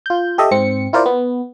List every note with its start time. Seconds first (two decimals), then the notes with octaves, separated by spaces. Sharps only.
0.06 F4 G6
0.38 G4 A4 D#5 E5
0.51 G#2 C4 C#7
0.93 E4 F4 A#4 C5 D5
1.06 B3